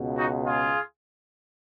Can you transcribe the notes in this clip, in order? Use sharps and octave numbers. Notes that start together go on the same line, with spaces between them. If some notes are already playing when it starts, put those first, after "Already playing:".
Already playing: C#2 B2
D#4 F#4
F4 G#4